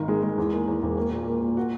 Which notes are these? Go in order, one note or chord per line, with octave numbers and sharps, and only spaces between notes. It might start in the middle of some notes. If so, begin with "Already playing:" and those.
Already playing: G#1 D#3
G#3
G#3
E2
A#3
E2
E1
A#3
A#2
A#3
A#2
F#4